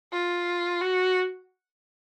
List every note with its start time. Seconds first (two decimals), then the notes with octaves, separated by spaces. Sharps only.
0.12 F4
0.81 F#4